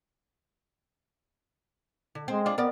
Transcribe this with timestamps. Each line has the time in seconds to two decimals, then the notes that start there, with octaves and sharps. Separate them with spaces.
2.15 D3
2.28 G#3 C4
2.46 D4 F4
2.58 B3 A#4 D5